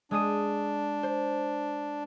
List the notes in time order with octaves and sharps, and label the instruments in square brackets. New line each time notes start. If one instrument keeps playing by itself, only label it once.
[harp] G#3 D#6 D#7 [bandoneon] D4
[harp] C5